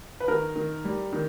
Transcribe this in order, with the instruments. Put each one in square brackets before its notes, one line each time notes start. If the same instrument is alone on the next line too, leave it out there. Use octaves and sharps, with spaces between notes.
[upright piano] B4
[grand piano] D#3 [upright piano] A#4
[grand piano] D#3
G3
D#3